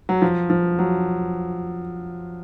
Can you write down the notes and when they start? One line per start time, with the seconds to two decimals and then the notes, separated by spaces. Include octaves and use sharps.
0.09 F#3
0.22 F3
0.50 F3
0.79 F#3